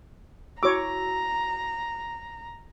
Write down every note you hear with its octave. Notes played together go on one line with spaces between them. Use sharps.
E4 F#4 C#5 A#5 D6 E6